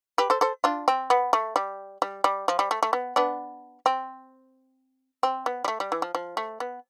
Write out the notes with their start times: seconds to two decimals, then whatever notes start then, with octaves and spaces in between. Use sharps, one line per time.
0.18 G4 B4
0.30 A4 C5
0.41 A4 C5
0.64 D4 F4
0.88 C4
1.10 B3
1.33 A3
1.56 G3
2.02 G3
2.24 G3
2.48 F3
2.59 G3
2.71 A3
2.83 A3
2.93 B3
3.16 B3 D4
3.86 C4
5.23 C4
5.46 B3
5.64 G3
5.68 A3
5.80 G3
5.92 E3
6.02 F3
6.15 F3
6.37 A3
6.60 B3